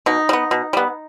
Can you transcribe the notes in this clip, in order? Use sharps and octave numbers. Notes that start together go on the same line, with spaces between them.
B2 D#4
G3
B3
B2
G3 B3